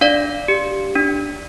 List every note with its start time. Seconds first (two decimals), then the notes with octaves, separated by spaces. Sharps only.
0.01 D4 D5 F5
0.48 G4
0.96 D4